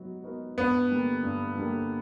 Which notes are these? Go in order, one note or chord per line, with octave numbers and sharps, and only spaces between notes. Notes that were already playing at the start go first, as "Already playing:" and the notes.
Already playing: F#3 B3 D#4 F#4
B3 D#4 F#4 A#4
G2 B3
D3 G3 A#3
G2
D3 G3 A#3